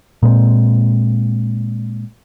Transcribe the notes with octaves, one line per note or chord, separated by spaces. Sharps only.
A#2 G#3 B3 C4